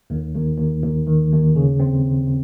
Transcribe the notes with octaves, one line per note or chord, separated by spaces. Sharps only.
D#2
D#2
D#2
D#2
D#3
D#2
C#3
C4